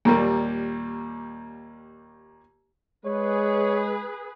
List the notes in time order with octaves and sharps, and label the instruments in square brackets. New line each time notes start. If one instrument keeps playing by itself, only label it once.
[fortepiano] D#2 A#2 G3 A#3
[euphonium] G#3 [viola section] G#4 B4 [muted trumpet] C#5